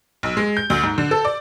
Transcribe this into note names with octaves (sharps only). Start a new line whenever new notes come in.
B1
G#3
G6
D2
G#2
D3
A4
D5